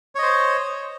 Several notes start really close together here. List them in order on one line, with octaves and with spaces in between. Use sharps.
C#5 D#5 C5